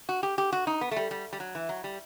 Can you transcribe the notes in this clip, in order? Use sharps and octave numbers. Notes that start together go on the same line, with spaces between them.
F#4
G4
G4
F#4
D#4
B3
A3
G3
G3
G3
F#3
E3
F#3
G3